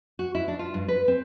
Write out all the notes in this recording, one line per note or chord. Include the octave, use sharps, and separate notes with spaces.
F#4
E4
D4
F4
G2
B4
C4